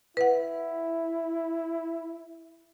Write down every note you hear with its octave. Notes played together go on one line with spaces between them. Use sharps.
E4 B4 F#5